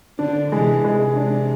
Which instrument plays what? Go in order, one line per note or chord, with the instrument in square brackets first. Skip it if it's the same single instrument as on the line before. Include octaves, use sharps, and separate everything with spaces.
[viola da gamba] D3 [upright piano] D4
[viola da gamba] C3 E3 [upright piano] G#3
[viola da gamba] C3 [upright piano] G#3
[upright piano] D4